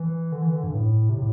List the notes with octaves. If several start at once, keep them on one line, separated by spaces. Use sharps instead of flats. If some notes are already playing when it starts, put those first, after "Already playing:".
Already playing: E3
D3
E3
D3
G2
A2
C3
A2